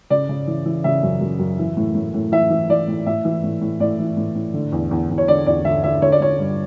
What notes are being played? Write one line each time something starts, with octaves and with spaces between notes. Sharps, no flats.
C#3 D5
C#3
E3
E3
C#3 E5
F#2
F#2
F#2
E3
A2
A2
A2
E3 E5
E3
E3 D5
A2
A2 E5
E3
A2
A2
A2 D5
E3
A2
A2
D3
E2
E2
E2
C#5
D3 D5
E2 D5
D3 E5
D3 E5
D3 C#5
D5
D3 C#5
G2